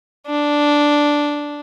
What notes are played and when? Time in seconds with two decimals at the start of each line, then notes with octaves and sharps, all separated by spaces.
0.27 D4